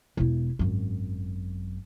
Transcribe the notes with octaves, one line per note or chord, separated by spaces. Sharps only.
E1 E4
G#1 F#2